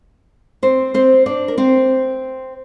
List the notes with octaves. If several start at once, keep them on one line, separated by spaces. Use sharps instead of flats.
C4 C5
C4 C5
D4 D5
A#4
C4 C5